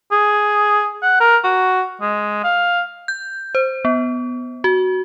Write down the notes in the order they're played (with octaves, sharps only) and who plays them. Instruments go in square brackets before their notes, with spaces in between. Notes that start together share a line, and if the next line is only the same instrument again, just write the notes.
[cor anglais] G#4
F#5
A#4
F#4
G#3
F5
[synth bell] G6
C5
B3
F#4